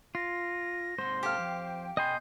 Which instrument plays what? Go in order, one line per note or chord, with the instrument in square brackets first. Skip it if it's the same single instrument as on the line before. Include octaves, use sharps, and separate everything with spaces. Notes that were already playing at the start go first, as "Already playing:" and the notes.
[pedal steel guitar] F4 [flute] A#6
[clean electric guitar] G#2 C3 C6 [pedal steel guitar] C5
[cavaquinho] G4 F5 [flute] A4
[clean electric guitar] F2 [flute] G5
[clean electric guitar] B2 G5 B5 [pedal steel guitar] D#5 G#5 C6 [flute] G6